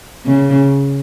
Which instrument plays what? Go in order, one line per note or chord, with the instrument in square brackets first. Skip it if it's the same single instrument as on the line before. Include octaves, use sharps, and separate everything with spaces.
[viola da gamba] C#3